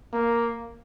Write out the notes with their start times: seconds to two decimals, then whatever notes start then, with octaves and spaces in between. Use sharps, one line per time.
0.13 A#3